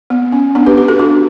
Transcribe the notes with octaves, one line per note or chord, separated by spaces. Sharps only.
B3
C#4
B3 D4
G4 B4
G4 B4
F#4 A4
D4 F#4